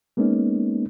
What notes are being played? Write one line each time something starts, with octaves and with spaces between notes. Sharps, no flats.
G#3 A#3 B3 C#4 D#4